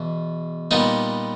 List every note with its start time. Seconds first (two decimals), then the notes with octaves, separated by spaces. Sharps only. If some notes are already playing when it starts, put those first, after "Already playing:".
Already playing: E2 B2
0.71 A#2 G3 B3 D#4